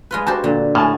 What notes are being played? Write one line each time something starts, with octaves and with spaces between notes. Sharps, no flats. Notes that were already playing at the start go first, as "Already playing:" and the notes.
G#3 F4 B4
F#4 G4 C5 A5
A#2 D3
A2 G#5 A5 F6